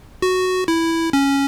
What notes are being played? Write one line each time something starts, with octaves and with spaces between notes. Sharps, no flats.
F#4
E4
C#4